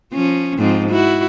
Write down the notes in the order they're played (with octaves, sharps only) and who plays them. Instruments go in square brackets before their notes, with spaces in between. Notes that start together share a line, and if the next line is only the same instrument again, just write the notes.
[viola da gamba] F3 C#4
G#2 F3 C4
E4 F#4